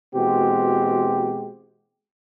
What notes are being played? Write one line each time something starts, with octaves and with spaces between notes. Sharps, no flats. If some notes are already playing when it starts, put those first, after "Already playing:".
B2 E3 G#3 C4 F#4 G4